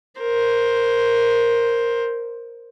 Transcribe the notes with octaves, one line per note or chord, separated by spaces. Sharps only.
A#4 C5